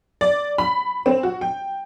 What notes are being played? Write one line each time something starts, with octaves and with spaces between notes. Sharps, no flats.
D5
B5
C4
F#4
G5